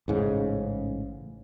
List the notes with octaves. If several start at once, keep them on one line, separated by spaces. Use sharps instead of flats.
A1 G#2 C#3